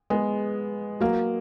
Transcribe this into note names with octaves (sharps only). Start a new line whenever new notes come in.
G#3 B3
F#3 A#3